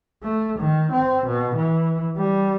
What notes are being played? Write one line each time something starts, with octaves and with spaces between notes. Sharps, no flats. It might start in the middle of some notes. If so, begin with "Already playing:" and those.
A3
D#3
C4
B2
E3
G3